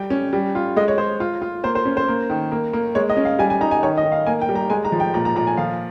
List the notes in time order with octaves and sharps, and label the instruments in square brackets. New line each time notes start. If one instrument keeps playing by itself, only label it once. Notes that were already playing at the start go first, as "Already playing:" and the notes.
Already playing: [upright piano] G3 G5
C#4
G3
F4
G#3 D#5
C#5
G#3 C5
F4
F4
A#3 C5
C5
C#4
C5
A#3
D#3
A#3
A#3
G#3 C#5
D#5
C#4
F5
G3 G#5
G#5
D#4 A#5
G#5
D#3 C#5
D#5
D#3
F5
A#3 G#5
G5
G3
A#5
G#3 G#5
A#5
F3
G5
A#2 A#5
A#5
A#2 A#5
G#5
F3 F5